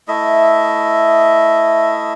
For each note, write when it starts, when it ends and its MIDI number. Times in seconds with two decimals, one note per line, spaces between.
0.08 2.13 57
0.08 2.13 64
0.08 2.13 75
0.08 2.13 76